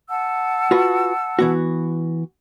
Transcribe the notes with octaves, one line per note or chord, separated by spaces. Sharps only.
F#5 A5 E6
F4 F#4 B4
E3 B3 F#4